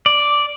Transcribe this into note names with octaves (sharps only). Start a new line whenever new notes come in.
D5